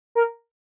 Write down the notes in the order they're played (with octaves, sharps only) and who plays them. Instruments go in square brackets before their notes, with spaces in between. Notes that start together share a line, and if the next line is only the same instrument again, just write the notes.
[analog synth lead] A#4